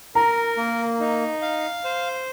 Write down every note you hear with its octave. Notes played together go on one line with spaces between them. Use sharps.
A#4 A#5
A#3
D#4
F5
C5